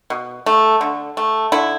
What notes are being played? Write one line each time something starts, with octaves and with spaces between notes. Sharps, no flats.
B2
A3
D3
A3
D3 E4